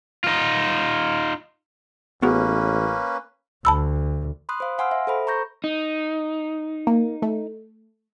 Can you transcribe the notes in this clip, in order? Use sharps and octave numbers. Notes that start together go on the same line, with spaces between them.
D#4 F4
A1 A#3 B3 C#4 F#4 G#4 B4
D2 A5 B5 E6
B5 C6 D#6 F#6
C5 F5
F5 F#5 G#5 C6 E6 F6
E5
A4 C5 B5
A#5 C#6 G6 A#6
D#4
A#3
A3